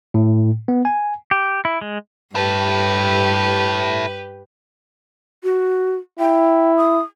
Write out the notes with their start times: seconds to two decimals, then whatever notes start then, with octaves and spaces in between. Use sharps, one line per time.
0.14 A2
0.68 B3
0.85 G#5
1.31 G4
1.65 E4
1.81 G#3
2.35 G2 E4 G4 A4 B4
5.43 F#4
6.19 E4 G5
6.77 D#6